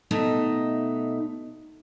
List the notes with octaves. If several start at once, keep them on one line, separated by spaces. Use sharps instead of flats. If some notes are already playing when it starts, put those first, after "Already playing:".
B2 A3 D#4 D#5 E5